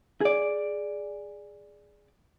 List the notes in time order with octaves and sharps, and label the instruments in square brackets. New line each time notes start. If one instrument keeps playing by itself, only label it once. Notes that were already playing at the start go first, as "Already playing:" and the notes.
[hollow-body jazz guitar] G#4 D5